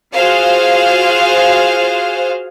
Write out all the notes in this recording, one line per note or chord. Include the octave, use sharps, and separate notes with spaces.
F4 F#4 G#4 C5 F5